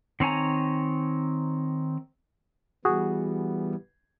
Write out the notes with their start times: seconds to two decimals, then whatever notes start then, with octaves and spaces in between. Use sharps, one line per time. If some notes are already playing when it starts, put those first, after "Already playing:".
0.20 D#3 C4 C#5 G#5 A#5
2.85 E3 G3 B3 F#4 G#4